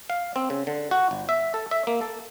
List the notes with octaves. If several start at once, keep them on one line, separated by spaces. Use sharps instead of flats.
F5
C4
C#3
D3
F#4
G1
E5
A4
E5
A#3
A4